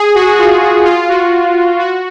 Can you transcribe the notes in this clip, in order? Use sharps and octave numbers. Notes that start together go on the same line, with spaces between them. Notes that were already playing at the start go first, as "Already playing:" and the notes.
Already playing: G#4
F#4
F4
F#4
F4
F#4
F#4